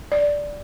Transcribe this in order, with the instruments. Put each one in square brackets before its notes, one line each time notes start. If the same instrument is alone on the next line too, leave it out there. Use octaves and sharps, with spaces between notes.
[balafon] D5